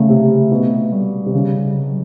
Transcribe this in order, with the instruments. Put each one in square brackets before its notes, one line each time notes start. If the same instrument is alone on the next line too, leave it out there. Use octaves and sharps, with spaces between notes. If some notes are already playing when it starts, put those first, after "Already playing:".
Already playing: [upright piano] C#3 [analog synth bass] A3
[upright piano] C3
B2
[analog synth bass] G3
[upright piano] C3
C#3
[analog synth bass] F#3